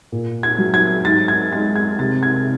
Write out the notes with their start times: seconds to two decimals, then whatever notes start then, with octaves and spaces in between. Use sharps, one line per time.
0.12 A#2
0.43 G#6
0.59 F#3
0.74 G#6
1.05 G#2 A6
1.28 G#6
1.52 G#3 A6
1.76 G#6
1.99 C3 A6
2.23 G#6